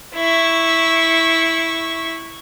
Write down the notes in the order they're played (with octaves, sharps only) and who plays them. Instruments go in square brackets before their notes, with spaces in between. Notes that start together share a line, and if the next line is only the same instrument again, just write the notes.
[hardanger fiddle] E4 C#6